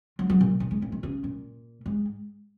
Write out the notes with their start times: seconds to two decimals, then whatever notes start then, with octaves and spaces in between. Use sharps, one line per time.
0.19 F#3
0.30 F#3
0.41 A#2
0.60 A#2
0.71 G#2
0.82 A#2
0.92 D#3
1.03 C#3
1.24 A#2
1.86 G#2